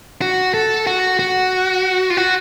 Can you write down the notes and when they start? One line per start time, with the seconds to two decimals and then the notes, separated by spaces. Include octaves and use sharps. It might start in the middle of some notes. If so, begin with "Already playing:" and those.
0.21 F#4
0.54 A4
0.87 F#4
1.19 F#4
2.10 F4
2.17 F#4